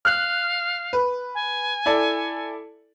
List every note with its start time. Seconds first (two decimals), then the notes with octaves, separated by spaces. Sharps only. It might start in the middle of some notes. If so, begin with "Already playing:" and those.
0.05 F5 F6 F#6
0.93 B4
1.35 G#5
1.86 E4 A4 D5